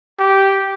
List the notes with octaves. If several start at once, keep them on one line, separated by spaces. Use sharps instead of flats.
G4